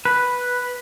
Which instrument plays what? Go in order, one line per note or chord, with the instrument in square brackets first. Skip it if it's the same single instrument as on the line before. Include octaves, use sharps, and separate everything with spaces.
[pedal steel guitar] B4